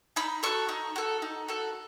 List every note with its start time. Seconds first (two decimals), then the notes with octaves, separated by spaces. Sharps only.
0.16 D#4 B5
0.43 F#4 A4 C#6
0.69 D#4
0.96 F#4 A4
1.22 D#4
1.48 F#4 A4